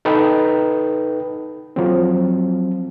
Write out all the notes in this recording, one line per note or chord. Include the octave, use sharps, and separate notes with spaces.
D#4 A4 B4 G5
F3 F#3 C4